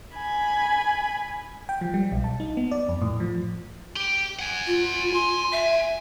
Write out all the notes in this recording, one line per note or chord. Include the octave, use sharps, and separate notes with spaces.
G#5 B5
G5
F3
G3
B1
A5
D#4
B3
D5
F2
A2
F3
G4
F#5 G#5
F4
C6
E5